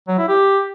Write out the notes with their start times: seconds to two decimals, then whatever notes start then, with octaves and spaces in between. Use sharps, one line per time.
0.08 F#3
0.19 E4
0.29 G4